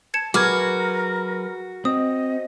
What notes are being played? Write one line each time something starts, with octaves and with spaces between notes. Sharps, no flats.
A5 G#6 C#7 E7
F#3 F#4 G#4 A#4 B4 D6 F6 G#6
C4 D#5 D#6